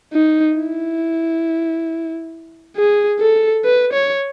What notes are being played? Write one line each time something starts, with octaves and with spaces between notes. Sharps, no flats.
D#4
E4
G#4
A4
B4
C#5